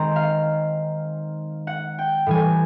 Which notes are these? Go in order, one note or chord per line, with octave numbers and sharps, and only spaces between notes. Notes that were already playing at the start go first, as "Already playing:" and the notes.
Already playing: D#3 G#3 C4 A#5
F5
F#5
G5
A2 E3 G3 G#5